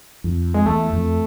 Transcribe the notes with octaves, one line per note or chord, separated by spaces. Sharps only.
F2
G#3
E2 A3
F2